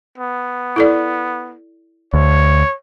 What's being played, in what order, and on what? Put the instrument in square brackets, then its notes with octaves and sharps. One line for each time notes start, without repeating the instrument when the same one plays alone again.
[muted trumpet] B3
[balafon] E4 A4 D5
[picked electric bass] D2 [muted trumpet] C#5